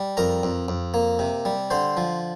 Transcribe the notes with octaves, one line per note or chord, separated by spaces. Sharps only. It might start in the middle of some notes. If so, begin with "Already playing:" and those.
Already playing: G3
F2 A#4 A#5
F2
F2
A#3
C3
G3
D3 C5 C6
F3